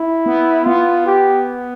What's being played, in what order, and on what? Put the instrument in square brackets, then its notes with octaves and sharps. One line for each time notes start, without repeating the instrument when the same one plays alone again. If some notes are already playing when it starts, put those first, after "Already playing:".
Already playing: [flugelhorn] E4
[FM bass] B3
[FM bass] B3 [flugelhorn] F4
[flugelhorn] G4